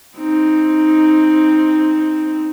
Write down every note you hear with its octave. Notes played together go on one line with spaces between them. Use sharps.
C4 D#4